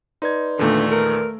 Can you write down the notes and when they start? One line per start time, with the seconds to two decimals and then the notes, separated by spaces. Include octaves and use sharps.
0.22 D#4 B4 D5 C6 G#6
0.59 E2 A#2 D3 D#3 A3
0.91 A#4